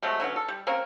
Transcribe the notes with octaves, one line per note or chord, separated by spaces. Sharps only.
C3 F#3 G#3 A3
D3 F#3 B3 C#4
A4
G3
A#3 C4 C#4 A#4